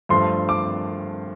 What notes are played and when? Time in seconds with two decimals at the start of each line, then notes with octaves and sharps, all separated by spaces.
0.09 G2 F3 A3 C6
0.49 D6